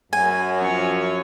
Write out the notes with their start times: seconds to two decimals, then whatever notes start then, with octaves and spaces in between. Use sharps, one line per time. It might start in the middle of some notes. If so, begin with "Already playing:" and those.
0.13 F#2 G#5
0.58 F3 C#4 C#5